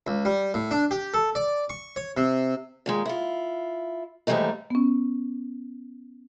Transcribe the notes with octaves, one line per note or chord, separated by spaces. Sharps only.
C#2
G3
A2
D4
G4
A4
D5
C#6
C#5
C3
A#2 D#3 G#3
E4 F4
D#2 G#2 E3 G3 A3 D#4
B3 C#4